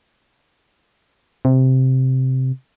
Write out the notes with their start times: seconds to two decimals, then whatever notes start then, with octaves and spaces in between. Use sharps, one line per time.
1.45 C3